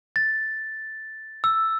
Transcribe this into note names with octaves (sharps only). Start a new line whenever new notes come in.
A6
E6